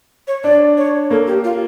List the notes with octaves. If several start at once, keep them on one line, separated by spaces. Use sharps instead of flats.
C#5
D4 D5
C#5
A#3 A4
G4
F4